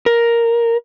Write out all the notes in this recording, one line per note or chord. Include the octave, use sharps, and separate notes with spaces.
A#4